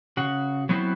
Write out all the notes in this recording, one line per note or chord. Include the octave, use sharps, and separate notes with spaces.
C#3 F#4
F#3 B3 C4 D#4 E4 F#4